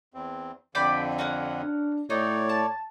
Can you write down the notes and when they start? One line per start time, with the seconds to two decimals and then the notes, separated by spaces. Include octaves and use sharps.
0.14 E2 C4
0.75 F2 D3 D5 G5 B5
1.19 C#4 A#4 F#5
1.64 D4
2.10 A2 D#4 C#5 D5
2.49 A5